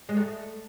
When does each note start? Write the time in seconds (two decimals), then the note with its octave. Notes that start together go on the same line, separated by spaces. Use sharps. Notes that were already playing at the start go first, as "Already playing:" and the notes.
0.09 G#3
0.17 A3